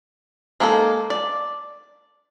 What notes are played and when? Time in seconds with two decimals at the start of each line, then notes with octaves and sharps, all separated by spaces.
0.60 G#3 A#3 D#4 F#4 A4
1.10 D5